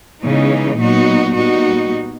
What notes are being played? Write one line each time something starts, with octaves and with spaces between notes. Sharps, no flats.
C#3 E3 G#3 B3 D#4
A#2 F#3 B3 D#4 F#4
A#2 G3 B3 D#4 F#4